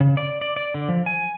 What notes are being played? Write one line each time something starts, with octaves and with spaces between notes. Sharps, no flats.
C#3
D5
D5
D5
D3
F3
G#5